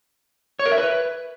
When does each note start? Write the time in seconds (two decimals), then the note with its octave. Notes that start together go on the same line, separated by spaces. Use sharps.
0.59 C#5
0.66 A#4
0.72 E5
0.78 B4